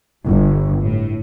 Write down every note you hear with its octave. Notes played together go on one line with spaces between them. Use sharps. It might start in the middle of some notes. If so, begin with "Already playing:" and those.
G1
A2